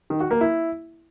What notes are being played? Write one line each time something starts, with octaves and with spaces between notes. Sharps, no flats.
D#3
F#4
A#3
E4